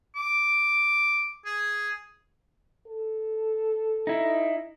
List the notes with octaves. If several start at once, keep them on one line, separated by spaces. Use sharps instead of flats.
D6
G#4
A4
D#4 E4